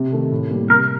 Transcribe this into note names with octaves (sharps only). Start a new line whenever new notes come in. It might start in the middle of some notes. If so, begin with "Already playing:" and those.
Already playing: C3
D#3 A3
A2
G3 A#3
C3 A#4